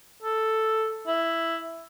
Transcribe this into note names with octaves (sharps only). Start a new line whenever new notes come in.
A4
E4